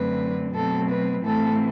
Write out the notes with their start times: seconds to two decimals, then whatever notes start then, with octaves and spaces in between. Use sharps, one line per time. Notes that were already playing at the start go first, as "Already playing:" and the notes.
Already playing: F#2 D3 F#3 A3 C4 B4
0.54 B2 F#3 A3 C4 A4
0.90 B4
1.25 A2 E3 A3 C4 A4